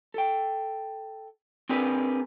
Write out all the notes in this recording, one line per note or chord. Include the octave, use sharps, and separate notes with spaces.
A4 G5
C4 D4 G#4 A#4 B4